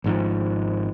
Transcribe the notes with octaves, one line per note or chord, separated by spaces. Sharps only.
G#1 G#2 F3